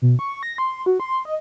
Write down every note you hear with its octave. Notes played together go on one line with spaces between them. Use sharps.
B2
C#6
A#6
C6
F#4
C6
D#5